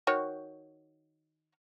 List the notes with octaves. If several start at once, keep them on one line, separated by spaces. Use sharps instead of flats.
D#3 F#4 C#5